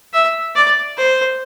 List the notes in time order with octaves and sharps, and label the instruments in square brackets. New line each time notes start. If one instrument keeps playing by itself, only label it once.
[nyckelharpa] E5
D5
C5